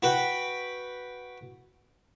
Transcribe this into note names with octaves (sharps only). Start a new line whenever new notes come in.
F#4 B4 G5